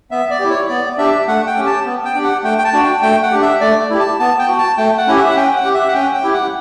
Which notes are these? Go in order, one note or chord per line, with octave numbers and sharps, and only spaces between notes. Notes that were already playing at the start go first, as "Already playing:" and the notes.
B3 E5
D5
E4 G4
C#5
B3 D5
D4 G4 E5
A3 F#5
G5
C#4 G4
A5
B3
G5
D4 G4
F#5
A3 G5
G5
A5
D4 F#4
G5
A3 G5
F#5
D4 G4
E5
A3 D5
E4 G4
A5
B3 A5
G5
F#4
A5
A3 G5
F#5
C#4 E4 G4
E5
F#5
C#4 G5
F#5
G4
E5
F#5
C#4 G5
G5
E4 G4
F#5